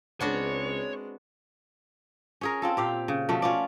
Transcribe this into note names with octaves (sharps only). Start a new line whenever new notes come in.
C#2 G#3 B3 C4 D4 F#4 C#5
C#4 G#4 A#4
C4 F4 A4
A#2 G4 F5
C#3
B2 F3 A3
C#4 F4 D5